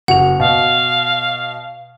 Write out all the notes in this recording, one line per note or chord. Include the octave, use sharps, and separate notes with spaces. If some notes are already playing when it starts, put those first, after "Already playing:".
F#1 F#4 F#5 F7
B2 F5